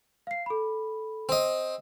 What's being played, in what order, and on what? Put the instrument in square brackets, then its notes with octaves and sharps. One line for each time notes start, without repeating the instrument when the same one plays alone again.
[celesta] F5 C7
A4 B5
[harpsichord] C4 D#5